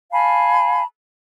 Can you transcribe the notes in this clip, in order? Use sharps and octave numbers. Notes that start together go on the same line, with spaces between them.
F5 G#5 A5 B5